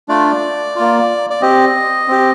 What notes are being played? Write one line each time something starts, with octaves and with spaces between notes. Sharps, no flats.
A3 D4 F4 D5
A#3 F4
D5
C4 G4 D#5
C4 G4